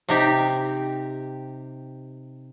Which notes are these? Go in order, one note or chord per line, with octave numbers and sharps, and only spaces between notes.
C3 D#4 G4